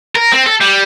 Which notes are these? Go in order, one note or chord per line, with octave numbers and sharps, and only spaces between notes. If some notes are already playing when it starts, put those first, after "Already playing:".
A#4
C4
A4
G3